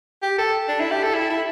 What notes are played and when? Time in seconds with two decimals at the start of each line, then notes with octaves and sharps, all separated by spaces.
0.23 G4
0.38 A4
0.68 D4
0.80 E4
0.92 G4
1.03 A4
1.14 E4
1.30 E4